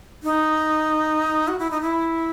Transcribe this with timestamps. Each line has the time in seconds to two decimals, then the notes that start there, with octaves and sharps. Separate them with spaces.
0.23 D#4
1.48 F#4
1.59 E4
1.71 D#4
1.81 E4